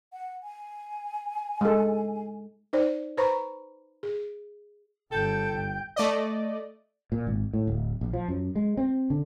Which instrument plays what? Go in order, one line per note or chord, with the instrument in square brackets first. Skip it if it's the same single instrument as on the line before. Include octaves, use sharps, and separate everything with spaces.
[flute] F#5
G#5
[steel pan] G#3 A4
[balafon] D#4 C5 D5
B4 C5 A#5 B5 C#6
G#4
[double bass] G1 [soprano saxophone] A4 [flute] G5 [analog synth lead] G6
[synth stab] A3 D5 D#5
[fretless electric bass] A#2
G#1
A2
D1
A#1
F3
F#2
G#3
C4
D3